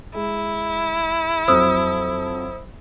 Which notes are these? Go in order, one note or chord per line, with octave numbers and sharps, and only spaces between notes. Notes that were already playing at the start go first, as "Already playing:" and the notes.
G#3 E4
F2 F#3 C5 D#6 E6